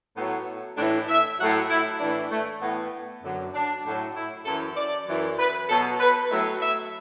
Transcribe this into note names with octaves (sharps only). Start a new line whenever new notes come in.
A2 F#3 B3
A2 E3 D4
E5
A2 F#3 F#5
E4
A2 E3 D4
A3
A2 E3 B3
F#2 D3 F#3
D4
A2 F#3
E4
F#2 E3 A4
D5
F#2 E3
B4
B2 F#3 A4
B4
A2 F#3 E5
E5